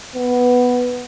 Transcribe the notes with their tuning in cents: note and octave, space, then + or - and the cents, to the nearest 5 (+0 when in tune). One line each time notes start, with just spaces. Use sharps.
B3 +0